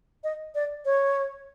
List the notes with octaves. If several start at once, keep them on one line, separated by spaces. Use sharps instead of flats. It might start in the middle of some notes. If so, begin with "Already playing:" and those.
D#5
D5
C#5